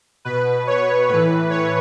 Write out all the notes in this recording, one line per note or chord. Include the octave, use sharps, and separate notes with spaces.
B2 B4
C#5
A2 E3 B4
C#5